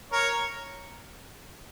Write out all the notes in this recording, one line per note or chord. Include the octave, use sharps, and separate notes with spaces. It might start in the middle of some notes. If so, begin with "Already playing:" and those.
A#4 C#5